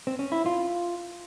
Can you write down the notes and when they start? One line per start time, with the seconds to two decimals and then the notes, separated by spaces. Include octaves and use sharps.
0.07 C4
0.19 C#4
0.32 E4
0.46 F4